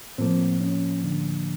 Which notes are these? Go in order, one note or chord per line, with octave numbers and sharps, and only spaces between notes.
A2 F3 A#3 C4
C#4
D3 D4